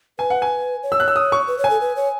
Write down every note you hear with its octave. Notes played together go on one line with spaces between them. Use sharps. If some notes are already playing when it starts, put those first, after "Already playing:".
B4 G#5
F#5
G#5
C#5
E6
F#6
E6
D#6
C#6
B4
C#5
G#5
A4
B4
C#5